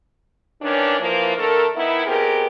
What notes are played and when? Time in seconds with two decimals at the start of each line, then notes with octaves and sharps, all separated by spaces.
0.62 D#3 E3 C#4 D4
1.00 E3 F3 A#3
1.37 D3 A3 A4 A#4
1.76 D#3 B3 D#4 E4
2.06 B2 C4 G4 G#4 A#4